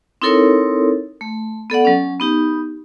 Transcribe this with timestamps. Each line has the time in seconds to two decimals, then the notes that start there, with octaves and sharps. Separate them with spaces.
0.22 C4 D#4 E4 A4 A#4 C#5
1.21 A3
1.70 B3 A4 D5 F#5
1.85 F#3 C#4
2.20 B3 D#4 G4